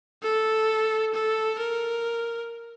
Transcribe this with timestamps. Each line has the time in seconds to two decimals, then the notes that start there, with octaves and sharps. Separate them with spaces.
0.23 A4
1.15 A4
1.59 A#4